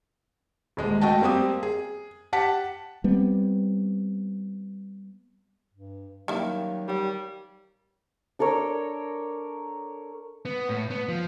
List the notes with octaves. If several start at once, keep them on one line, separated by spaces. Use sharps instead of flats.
D#1 G#3 D#5
A3 F#4 D#5 G5 A5
G3 A#3 C4 G4 D#6
G#4
G4 F#5 A5 B6
G3 B3 C4
G2
D#3 F#3 G3 A#3 E4 G4 F5
G3 C#5 G5
D4 A4 A#4 C#5
B3
A2
B3
F3